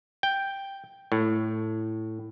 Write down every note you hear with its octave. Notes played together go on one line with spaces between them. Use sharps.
G5
A2